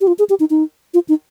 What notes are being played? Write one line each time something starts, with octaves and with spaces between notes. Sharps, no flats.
G4
F4
G#4
G4
D#4
D#4
F4
D#4